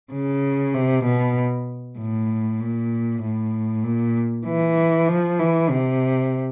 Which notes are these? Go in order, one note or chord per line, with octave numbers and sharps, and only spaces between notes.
C#3
C3
B2
A2
A#2
A2
A#2
E3
F3
E3
C3